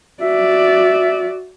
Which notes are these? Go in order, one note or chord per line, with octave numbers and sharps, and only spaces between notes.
F#4 D5 E5